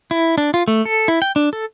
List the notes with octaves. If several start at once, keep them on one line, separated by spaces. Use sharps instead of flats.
E4
D4
F4
A3
A4
E4
G5
D4
A4